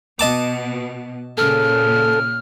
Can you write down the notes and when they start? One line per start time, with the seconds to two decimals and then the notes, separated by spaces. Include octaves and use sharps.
0.19 B2 D#5 A5 D6
1.38 A#2 C#3 A4 F6